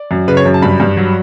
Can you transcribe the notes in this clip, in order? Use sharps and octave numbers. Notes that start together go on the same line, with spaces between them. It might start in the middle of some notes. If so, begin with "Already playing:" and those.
Already playing: D5
F#2
C#3 B4
C#5
F#2
A5
G2 B5
G2
F#3